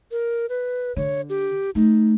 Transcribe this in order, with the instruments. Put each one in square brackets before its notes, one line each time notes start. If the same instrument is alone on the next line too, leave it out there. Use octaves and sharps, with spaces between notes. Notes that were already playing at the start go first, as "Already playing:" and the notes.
[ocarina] A#4
B4
[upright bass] D3 [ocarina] C#5
[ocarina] G4
[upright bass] A3 [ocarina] D#4